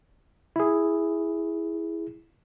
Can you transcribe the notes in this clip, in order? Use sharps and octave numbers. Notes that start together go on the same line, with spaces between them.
E4 G#4